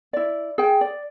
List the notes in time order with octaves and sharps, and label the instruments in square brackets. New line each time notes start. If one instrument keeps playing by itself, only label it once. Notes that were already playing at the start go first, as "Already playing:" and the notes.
[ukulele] E4 D5
G#4 G5
D5